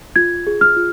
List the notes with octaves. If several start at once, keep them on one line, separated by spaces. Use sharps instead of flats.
F4 G#6
G#4
F6
F4